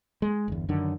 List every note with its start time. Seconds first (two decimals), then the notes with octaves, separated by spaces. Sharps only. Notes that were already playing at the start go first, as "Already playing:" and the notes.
0.22 G#3
0.48 G1 E2
0.69 F#2 D3 D#3